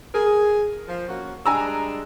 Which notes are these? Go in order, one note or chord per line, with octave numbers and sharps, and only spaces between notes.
G#4 A#4
F3
A#3 C#4 F#4
G3 G#3 D4 G#5 A#5 E6